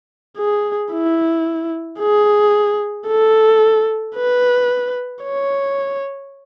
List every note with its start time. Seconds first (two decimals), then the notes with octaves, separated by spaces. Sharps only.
0.38 G#4
0.92 E4
2.00 G#4
3.07 A4
4.16 B4
5.23 C#5